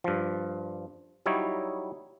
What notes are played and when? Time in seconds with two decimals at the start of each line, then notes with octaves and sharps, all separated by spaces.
0.04 G2 F3
1.26 F#3 G3 D#4 E4 C#5